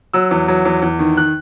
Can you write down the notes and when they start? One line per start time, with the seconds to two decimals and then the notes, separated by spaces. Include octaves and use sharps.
0.13 F#3 E6
0.31 E2
0.48 F#3
0.65 E2
0.82 E2
0.99 D#3
1.17 D#3 F#6